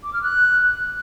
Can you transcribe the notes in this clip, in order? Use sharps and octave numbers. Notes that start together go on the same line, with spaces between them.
D6
F6
F#6